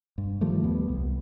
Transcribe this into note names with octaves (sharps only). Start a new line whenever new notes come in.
G2
D#3 F3 G3 A3
D#2 G3 B3
C2